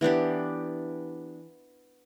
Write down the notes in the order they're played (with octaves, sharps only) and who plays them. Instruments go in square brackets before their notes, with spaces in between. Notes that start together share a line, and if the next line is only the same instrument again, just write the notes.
[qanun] E3 B3 D4 G4